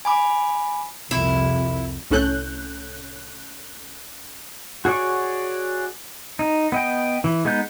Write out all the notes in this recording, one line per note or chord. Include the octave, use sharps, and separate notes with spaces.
G#5 B5 D6
C2 F2 E4
C2 A2 C#4 A4 F#6 G6
F#4 G#4 C#5 D5 C#6
D#4
B3 D#5 G5
E3
G#3 B3 D#4 G6